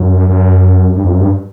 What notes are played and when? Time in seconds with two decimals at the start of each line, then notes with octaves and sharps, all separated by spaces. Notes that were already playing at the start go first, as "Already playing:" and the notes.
Already playing: F#2
0.30 F#2
0.96 G2
1.03 F2
1.12 F#2
1.21 G2